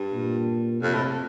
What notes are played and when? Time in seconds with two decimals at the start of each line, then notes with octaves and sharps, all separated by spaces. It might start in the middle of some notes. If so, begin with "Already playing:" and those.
Already playing: G2
0.12 A#2
0.82 F2 C3
0.94 A2